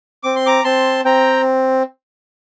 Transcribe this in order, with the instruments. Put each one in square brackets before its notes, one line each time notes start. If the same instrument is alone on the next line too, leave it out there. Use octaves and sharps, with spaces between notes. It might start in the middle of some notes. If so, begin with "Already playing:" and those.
[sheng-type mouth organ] C4 D6
C6
A#5 D6
C4 A5 C6
C4 G5 A#5